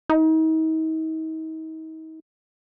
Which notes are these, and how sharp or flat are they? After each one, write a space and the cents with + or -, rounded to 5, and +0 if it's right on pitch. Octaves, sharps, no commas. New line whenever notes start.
D#4 +40